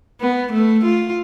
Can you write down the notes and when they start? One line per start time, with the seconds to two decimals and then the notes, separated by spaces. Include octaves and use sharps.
0.21 B3
0.52 A3
0.85 F4